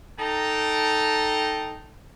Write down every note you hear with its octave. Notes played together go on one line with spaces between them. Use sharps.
D#4 A4 G5 A5 A#5